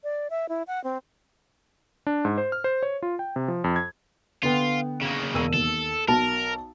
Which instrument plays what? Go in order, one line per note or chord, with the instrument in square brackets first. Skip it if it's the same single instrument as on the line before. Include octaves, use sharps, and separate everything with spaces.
[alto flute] D5
E5
E4
F#5
C4
[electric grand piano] D4
G#2
C5
F6
C5
C#5
F4
G5
C3
F3
F2
G#6
[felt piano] D3 B3 G5 [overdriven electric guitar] F4
[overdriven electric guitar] C#3 A#3
[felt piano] E1 E6 D#7
[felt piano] D#2 [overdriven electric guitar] A4
[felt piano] B1 F#4 A5 [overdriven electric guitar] A#4